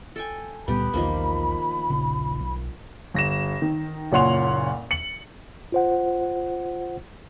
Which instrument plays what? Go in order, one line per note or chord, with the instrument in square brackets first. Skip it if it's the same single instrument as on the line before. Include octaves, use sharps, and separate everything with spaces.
[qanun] A4 G5 G#5
[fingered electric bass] C#2 A#2 G3 [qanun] B3 G4 [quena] B5
[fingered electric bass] B1 E2 [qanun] D#3 F3 A#3
[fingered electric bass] D#1 A#1 C#3
B1
[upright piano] G1 A#6 E7
D#3
F#1 A#2 C#4 F#5 C6 F7
C#7 F#7
[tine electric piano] F4 C5 F#5